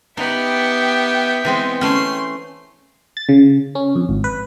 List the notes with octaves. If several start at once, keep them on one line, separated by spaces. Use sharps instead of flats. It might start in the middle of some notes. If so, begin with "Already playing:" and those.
B3 D#4 G4 E5 G5
E3 G#3 B3 C4
A3 C#4 C6
A6
C#3
C#4
F2
G#1
B4